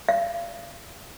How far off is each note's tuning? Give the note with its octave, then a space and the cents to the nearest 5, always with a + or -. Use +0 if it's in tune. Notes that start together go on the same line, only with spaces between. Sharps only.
F5 -30